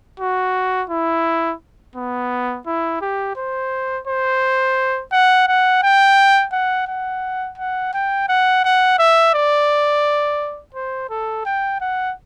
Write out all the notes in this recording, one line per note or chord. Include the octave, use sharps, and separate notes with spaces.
F#4
E4
B3
E4
G4
C5
C5
F#5
F#5
G5
F#5
F#5
F#5
G5
F#5
F#5
E5
D5
C5
A4
G5
F#5